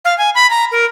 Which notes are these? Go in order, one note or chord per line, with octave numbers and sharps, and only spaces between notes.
F5
G#5
B5
A#5
A#4